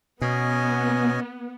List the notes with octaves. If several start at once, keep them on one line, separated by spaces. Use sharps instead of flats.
B2 B3 C#4 D#5 G#5